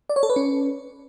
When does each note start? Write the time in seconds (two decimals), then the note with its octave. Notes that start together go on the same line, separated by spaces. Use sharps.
0.09 D5
0.16 C#5
0.23 A4
0.30 B4
0.36 C#4